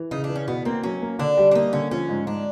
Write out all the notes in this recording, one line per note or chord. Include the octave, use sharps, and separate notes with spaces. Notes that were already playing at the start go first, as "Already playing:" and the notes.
Already playing: E3
C#3 D#4
D4
E3
C#4
B2 B3
A#3 C4
F#3 C#4
A#3
D3 D4
G3
D4
A#3 D#4
D3 C#4
F3 C#4
G#2
G#2 D4